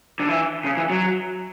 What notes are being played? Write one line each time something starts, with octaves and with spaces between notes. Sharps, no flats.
D3
E3
C#3
E3
F#3